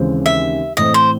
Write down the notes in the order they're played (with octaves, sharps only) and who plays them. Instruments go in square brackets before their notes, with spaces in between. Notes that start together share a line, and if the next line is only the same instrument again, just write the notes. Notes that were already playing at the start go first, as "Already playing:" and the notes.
Already playing: [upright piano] D#2 C#3 E3 G#3 C4
[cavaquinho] E5
[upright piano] A2 E3 C4 [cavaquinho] D#5
[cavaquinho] C5